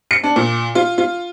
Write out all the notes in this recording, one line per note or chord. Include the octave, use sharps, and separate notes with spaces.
C#7
D4
A#2
F4
F4